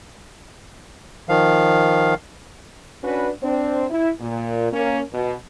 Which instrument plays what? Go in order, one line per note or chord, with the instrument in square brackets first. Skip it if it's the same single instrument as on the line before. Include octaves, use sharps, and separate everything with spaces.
[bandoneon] D#3 F3 F5
[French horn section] C#4 D4 F#4 B4
C4 D4 C5
E4
A#2
A#3 C#4
B2